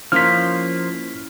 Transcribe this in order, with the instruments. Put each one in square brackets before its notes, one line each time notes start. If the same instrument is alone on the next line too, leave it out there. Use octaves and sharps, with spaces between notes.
[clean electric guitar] F3 A#3 F4 [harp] C#4 E4 [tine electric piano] F6 B6